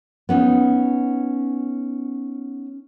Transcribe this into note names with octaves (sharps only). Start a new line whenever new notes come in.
B3 C#4 D#4